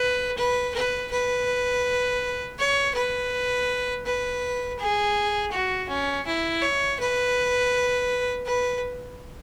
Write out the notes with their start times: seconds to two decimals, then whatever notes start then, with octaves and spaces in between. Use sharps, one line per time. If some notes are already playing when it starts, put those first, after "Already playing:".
Already playing: B4
0.38 B4
0.74 B4
1.11 B4
2.59 C#5
2.95 B4
4.06 B4
4.79 G#4
5.52 F#4
5.89 C#4
6.26 E4
6.62 C#5
6.99 B4
8.46 B4